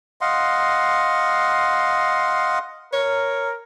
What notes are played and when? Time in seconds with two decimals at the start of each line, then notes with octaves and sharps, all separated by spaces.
0.21 D#5 F5 F#5 C6
2.93 A#4 C#5